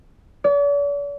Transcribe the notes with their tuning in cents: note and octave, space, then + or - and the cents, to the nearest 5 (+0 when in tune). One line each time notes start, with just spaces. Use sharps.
D5 -45